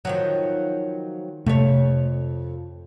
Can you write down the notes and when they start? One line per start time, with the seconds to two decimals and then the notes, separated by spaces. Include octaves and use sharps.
0.05 D#3 F3 F#3
1.46 F2 C3 A3 C#5